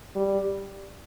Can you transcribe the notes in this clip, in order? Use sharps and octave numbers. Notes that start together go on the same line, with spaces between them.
G3